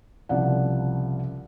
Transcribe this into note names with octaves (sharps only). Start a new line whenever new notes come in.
C2 C#3 F3 D5 F#5